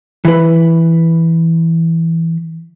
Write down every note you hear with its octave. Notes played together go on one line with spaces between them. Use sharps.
E3 B4